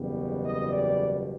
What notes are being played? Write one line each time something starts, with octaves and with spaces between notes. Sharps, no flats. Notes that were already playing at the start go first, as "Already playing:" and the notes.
Already playing: F#1 E2 B2 G3
D#5
D5